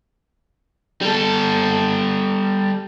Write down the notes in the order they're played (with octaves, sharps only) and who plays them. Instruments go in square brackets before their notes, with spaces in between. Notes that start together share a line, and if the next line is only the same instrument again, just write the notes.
[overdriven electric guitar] G3 A4